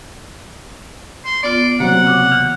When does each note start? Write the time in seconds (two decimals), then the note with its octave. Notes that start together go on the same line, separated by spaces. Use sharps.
1.25 C6
1.43 B3 F4 D5
1.80 C3 F#3 A#3 C4 F#5
2.07 C#3 C#6 D6
2.32 E3 F6